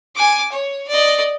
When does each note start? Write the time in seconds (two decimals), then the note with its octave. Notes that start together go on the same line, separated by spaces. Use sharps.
0.16 G#5 D6
0.52 C#5
0.88 D5 D#5